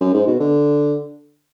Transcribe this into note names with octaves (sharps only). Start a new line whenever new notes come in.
F#2
G#2
B2
D3